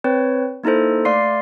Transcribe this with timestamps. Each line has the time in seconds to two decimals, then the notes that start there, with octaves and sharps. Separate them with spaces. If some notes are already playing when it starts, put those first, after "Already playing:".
0.04 C4 B4 C#5
0.64 A#3 D#4 E4 A4 C5
1.05 A3 D5 F5 C6 C7